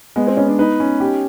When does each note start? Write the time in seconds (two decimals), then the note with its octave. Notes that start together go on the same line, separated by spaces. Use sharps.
0.16 G#3 B3
0.27 C4
0.37 B3 C#4
0.48 D4
0.59 D#4 B4
0.80 C#4
1.00 G4